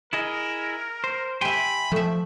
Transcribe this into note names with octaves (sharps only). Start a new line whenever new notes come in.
E4 G#4 A#4 D#5
C5
G4 E5 G5 G#5 B5 C6
F3 A3 E5